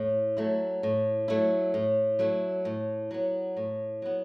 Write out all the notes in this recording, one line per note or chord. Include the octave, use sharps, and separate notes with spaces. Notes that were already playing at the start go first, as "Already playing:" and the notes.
Already playing: A2
F#3 A3 E4
A2
F#3 A3 E4
A2
F#3 A3 E4
A2
F#3 B3
A2
F#3 B3